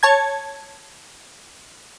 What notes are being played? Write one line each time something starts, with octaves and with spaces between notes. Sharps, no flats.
C#5 A5 G#6